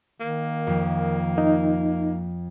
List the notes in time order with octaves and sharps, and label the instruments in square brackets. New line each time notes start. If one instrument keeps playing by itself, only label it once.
[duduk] D#3 [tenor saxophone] A#3
[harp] F2 F3
[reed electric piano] D#4